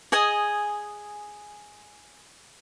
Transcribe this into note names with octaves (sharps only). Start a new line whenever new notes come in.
G#4 D#5 G#5